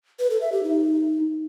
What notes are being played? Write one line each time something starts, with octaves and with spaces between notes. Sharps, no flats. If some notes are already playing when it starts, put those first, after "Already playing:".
B4
A4
E5
G4
D#4